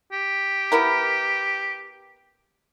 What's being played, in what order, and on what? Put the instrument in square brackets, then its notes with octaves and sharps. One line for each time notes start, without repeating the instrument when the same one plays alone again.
[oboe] G4
[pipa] B3 E4 A#4